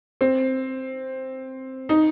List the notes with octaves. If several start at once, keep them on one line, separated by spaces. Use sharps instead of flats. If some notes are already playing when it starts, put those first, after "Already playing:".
C4
D#4